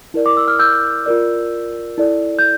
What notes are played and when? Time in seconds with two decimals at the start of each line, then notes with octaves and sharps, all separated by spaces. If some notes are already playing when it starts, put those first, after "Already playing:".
0.14 E4 A#4 D5
0.26 D6
0.37 E6
0.48 F6
0.59 E6 G6
1.06 F4 A#4 D5
1.98 E4 A4 D5
2.39 G6